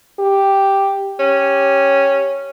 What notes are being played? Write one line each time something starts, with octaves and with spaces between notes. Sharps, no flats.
G4
C#4 G4